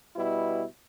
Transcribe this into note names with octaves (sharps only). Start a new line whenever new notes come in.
B2 G3 E4